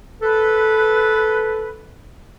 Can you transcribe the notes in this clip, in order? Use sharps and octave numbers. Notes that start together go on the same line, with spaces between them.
A4 B4